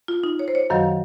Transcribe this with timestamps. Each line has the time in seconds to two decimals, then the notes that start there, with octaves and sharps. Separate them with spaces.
0.08 F4
0.24 D#4
0.39 C#5
0.48 C5
0.55 C#5
0.70 F#2 D#3 F#3 F5